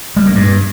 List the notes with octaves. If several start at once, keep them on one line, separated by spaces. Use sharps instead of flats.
G3
A#3
G2